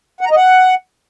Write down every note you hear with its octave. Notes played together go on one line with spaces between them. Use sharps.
F#5
A#5
D#5
F#5